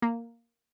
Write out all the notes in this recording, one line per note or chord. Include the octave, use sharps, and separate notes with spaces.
A#3